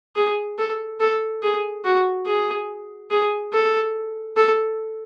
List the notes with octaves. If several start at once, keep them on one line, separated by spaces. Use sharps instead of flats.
G#4
A4
A4
G#4
F#4
G#4
G#4
A4
A4